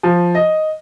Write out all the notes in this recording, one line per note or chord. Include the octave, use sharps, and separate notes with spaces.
F3
D#5